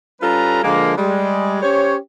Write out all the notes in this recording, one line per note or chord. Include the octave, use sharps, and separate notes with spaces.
G3 C#4 F4 A4 B4 A#5
D3 F3 G#3 A#3
G3 G#3
C#4 G4 C5 C#5